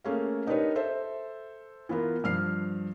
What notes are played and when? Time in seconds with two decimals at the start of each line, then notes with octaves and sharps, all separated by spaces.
0.04 A3 A#3 C#4 G#4 F5
0.47 D4 D#4 G4 A#4 B4 C#5
0.75 A4 C5 E5
1.89 E3 B3 F4 A#4
2.24 G2 F3 F6 C7